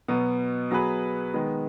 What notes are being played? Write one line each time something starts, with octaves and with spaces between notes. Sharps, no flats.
B2 F#3 B3
F#3 B3 G#4 B4
D#3 G#3 B3